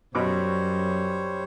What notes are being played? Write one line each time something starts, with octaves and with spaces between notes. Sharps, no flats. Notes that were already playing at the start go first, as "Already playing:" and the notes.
F#2 B2 G3 B3 C5 C#5 D6